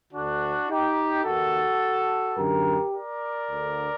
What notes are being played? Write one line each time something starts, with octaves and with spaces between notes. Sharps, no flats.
D2 D3 D4 F#4
D#4 G4
D#2 D#3 F#4 A4
F#2 D3 G4 A#4
A#4 D5
D2 D3